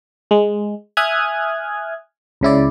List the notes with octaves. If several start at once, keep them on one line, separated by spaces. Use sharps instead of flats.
G#3
E5 G#5 D#6 F6 F#6 G#6
C#2 C#3 E4 D5